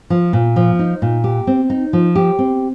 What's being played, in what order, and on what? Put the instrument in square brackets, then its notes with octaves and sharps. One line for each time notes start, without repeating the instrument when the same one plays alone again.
[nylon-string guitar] F3
A#2
F3
D#4
A#2
G4
C4
D#4
F3
G4
C4